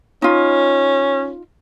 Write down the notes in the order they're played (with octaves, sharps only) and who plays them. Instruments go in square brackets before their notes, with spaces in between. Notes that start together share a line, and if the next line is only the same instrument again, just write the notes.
[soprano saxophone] C#4 [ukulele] D#4 F4